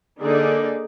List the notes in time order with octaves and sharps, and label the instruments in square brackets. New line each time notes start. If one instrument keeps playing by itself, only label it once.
[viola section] D3 A#3 D#4 G#4 D5